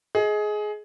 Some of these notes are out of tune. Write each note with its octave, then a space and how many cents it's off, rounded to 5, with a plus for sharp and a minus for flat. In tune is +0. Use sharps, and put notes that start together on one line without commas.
G#4 +20 D#5 +20